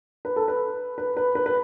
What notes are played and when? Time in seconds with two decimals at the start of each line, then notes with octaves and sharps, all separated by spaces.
0.25 B4
0.36 A4
0.48 B4
0.98 B4
1.17 B4
1.35 B4
1.46 B4